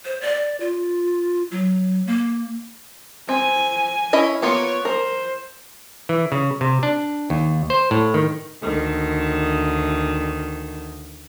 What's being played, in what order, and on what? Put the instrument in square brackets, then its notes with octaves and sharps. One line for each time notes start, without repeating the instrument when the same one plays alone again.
[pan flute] C5
D5
F4
F#3
A#3
[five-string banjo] C4 [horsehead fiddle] G#5
[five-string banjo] C#4 E4 D#5
[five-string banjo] A#3 B3 F4 [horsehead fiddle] C#5
[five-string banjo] A#4 [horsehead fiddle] C5
[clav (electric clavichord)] E3
C#3
C3
D4
D#2
C5
A2
D#3
[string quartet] D2 D#3